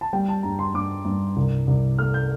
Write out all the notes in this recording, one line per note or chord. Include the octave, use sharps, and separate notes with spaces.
A5
G3 G5
A5
G2 A#5
C6
G2 D6
G2
C2
C2
A3 F6
G6